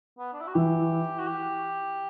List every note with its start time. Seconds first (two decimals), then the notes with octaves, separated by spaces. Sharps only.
0.18 B3
0.33 D4
0.41 E4
0.47 F#4
0.54 E3 G4
1.19 F#4
1.27 G4